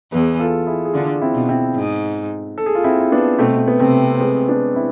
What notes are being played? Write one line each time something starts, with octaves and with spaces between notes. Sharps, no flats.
E2 E3 G#4 B4
F4 A4
E4 G#4
G#4
D3 D4 F4
C4 E4
B2
C4 E4
G#2
A4
G#4
F4
C4 E4
E4
B3 D4
B2 A3 C4
B3
C3 A3 C4
C4
G#3 B3
B3 D4
C4 E4